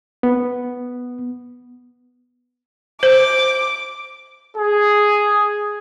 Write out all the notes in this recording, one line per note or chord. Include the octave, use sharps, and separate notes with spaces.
B3
C5 D6
G#4